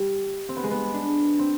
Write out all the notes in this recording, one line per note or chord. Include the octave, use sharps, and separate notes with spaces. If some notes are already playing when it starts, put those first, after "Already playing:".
Already playing: G3
C4
B3
G#3
B3
D4
C4